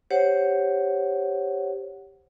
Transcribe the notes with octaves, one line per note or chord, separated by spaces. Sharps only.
G4 C5 C#5 F#5